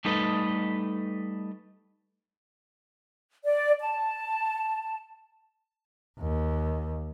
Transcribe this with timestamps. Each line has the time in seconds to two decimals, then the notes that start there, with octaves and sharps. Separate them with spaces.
0.05 G3 A3 D#4 A4 B4 D#5
3.44 D5
3.81 A5
6.19 D#2